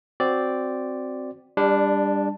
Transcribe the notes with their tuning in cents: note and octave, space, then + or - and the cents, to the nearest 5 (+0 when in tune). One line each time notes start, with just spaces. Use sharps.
C4 +0 F#4 +0 D5 +0
G3 +30 D4 +0